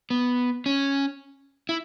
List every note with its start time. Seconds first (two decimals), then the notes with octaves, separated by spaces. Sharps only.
0.10 B3
0.66 C#4
1.69 E4